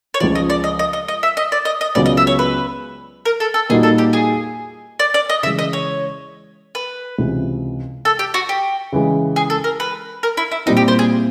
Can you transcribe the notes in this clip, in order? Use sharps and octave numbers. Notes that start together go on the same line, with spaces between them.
C#5
C#2 C#3 F3 D5
D#5
D5
D#5
D#5
D#5
D#5
E5
D#5
D5
D#5
D#5
C#2 C#3 F#3 B3 D5
D#5
E5
C#5
B4
A#4
A4
A4
A#2 G3 A#3 D#4 F#4 G#4
A4
G4
G#4
D5
D5
D#5
C#3 E3 G#3 E5
D#5
C#5
B4
C#2 C3 E3
A4
G4
F#4
G4
C#3 E3 G#3
G#4
A4
A#4
B4
A#4
E4
E4
A#2 G3 C4 D#4 E4
G4
C5
G#4